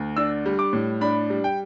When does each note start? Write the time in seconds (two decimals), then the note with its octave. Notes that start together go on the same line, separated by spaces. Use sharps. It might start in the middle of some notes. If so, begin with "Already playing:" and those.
Already playing: D2
0.16 D4 E6
0.46 G3
0.59 D6
0.73 A2
1.01 D4 B5
1.30 G3
1.44 G5